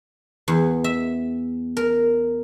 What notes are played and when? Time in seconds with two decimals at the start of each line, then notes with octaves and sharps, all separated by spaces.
0.48 E2
0.84 E5
1.77 A#4